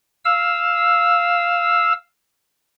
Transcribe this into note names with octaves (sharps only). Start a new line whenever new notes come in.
F5 E6